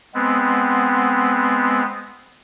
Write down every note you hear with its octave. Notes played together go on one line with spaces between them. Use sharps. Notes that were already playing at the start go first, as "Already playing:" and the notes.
G#3 B3 C4